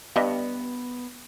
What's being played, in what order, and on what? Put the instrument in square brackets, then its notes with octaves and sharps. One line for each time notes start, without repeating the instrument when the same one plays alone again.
[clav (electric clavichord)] G2 [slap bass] B3 [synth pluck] G4 D#5 E5